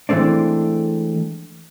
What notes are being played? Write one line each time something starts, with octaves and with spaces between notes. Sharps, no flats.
E3 G#3 A3 C4 D4